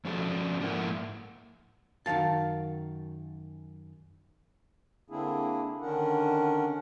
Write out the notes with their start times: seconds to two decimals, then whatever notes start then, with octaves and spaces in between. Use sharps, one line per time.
0.05 F3 C#4 D4 F#4 A4
0.60 G#2 F3 A#3 E4 A#4 F#5
2.06 F#2 D#3 E3 F5 A5
5.10 D3 A#3 C4 D4 E4 G#4
5.81 D3 D#3 C#4 D4 A#4 F#5